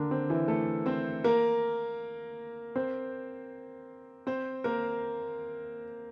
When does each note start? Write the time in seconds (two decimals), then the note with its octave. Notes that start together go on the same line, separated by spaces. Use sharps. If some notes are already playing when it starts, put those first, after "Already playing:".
Already playing: D3 A#3 D4 A#4
0.11 C4
0.30 E3 E4
0.48 A3 A4
0.86 C4 C5
1.24 A#3 A#4
2.76 C4 C5
4.27 C4 C5
4.64 A#3 A#4